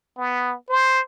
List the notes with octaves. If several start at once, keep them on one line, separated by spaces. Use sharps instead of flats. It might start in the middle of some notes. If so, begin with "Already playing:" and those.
B3
C5